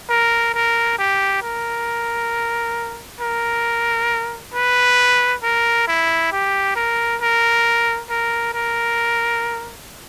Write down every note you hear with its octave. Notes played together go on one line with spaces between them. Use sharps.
A#4
A#4
G4
A#4
A#4
B4
A#4
E4
G4
A#4
A#4
A#4
A#4